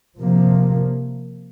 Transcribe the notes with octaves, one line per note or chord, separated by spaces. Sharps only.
C3 F3 A#3